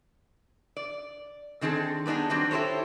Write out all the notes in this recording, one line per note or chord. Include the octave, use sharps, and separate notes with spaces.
D5
D3 D#3 C4 G#4 A4
G3 B3 D4 D#4 G#4
D#3 F#3 G3 A#3 C4 D4
E4 G4 A4 C5 C#5